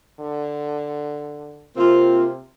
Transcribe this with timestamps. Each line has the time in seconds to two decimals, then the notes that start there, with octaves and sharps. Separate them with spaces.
0.20 D3
1.77 C3 A#3 C4 F4